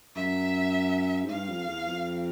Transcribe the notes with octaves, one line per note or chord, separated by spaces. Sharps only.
F#2 E5
G#2
G2 F5
F2
E2
F2